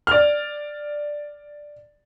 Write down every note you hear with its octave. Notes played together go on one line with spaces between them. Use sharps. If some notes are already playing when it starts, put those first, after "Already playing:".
D5 F6